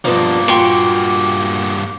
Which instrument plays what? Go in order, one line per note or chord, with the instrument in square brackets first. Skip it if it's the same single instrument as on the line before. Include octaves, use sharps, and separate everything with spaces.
[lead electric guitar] G2 A#3 [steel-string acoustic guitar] F3 B3 D4
[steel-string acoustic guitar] A#2 F#4 [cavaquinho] G4 C6 C#6